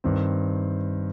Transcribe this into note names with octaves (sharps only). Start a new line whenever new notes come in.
G2 D#3 C4